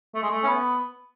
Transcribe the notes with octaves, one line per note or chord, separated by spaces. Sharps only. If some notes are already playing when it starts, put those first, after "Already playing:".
A3
G#3
A3
C#4
B3